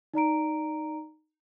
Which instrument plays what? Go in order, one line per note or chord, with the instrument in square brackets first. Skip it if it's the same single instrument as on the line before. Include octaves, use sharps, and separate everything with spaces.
[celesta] D#4 D5 A#5 D7